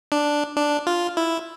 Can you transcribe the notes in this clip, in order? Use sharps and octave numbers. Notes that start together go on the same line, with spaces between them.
D4
D4
F4
E4